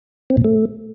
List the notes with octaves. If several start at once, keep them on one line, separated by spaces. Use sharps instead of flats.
C4
A#2
A3